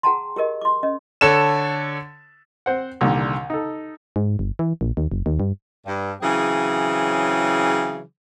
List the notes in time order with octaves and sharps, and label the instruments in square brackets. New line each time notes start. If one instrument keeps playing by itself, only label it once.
[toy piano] G#4 F#5 G5 A5 A#5 C6
G4 G#4 A#4 D#5
C6 D6
C#4 D#5
[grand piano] D3 A4 C#5 E7
[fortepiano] C4 C5 F#5
C2 A#2 D3 D#3
D#4 A4
[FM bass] G#2
G1
E3
A#1
D#2
F#1
D#2
G2
[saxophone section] G2
C#3 E3 F#3 C4 G#4